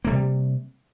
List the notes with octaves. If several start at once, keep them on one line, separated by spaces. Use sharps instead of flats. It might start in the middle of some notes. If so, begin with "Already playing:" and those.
C3 G3 A3 A#3